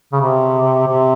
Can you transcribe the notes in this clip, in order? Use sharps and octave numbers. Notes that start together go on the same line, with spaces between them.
C#3
C3
C3